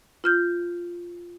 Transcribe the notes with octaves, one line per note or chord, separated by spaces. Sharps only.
F4 F6 G6